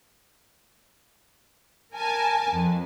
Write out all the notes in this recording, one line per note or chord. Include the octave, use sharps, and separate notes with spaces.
A#4 G#5 A5
F2